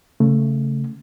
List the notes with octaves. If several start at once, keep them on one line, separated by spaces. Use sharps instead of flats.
C#3 A3